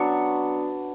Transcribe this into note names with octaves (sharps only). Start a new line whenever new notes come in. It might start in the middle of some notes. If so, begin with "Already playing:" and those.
Already playing: F#3 B3 D4 C#6